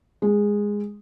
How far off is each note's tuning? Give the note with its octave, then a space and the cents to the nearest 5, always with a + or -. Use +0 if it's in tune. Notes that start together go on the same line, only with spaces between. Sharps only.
G#3 -10